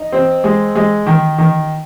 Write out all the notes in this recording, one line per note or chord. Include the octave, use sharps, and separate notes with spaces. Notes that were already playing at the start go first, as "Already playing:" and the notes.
Already playing: D#4
C4
G#3
G#3
D#3
D#3